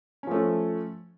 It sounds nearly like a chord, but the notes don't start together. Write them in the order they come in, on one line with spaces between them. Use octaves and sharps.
C#4 F3 A3